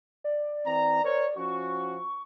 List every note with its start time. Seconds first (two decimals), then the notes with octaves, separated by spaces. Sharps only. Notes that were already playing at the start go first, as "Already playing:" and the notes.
0.24 D5
0.65 E3 C4 A#5
1.04 A#4 C5 C#5
1.37 F3 C#4 F#4 C#6